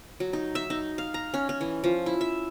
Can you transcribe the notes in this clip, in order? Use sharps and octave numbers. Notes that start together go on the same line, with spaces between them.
F#3
D#4
E5
D#4
F5
A#5
C#4
C#4
E3
F3
E4
E5